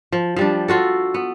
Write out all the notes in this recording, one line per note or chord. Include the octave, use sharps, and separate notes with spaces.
F3
F3 G3 D4
F4 F#4 A4
B3